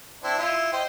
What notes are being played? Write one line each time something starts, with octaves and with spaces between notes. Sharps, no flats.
C4 D4 E4
E4 F4 E5
C5 D#5 G5